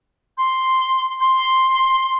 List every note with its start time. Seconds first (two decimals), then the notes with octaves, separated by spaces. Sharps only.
0.37 C6
1.20 C6